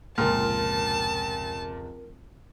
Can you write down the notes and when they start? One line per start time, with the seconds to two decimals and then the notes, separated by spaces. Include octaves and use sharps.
0.18 F1 C#2 A#2 A#4 A5 C6 F6